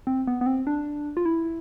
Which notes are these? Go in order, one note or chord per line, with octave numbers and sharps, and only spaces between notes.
C4
B3
B3
C4
D4
F4
E4